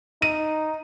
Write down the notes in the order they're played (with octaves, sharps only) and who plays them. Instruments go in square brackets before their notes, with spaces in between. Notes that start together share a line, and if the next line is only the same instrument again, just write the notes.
[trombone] D#4 [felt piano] D#7